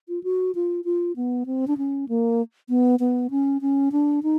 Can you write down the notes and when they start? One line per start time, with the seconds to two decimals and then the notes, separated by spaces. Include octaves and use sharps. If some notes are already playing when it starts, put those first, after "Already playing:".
0.09 F4
0.24 F#4
0.55 F4
0.85 F4
1.16 B3
1.46 C4
1.67 D4
1.78 C#4
2.09 A#3
2.69 B3
3.00 B3
3.31 C#4
3.61 C#4
3.92 D4
4.23 D#4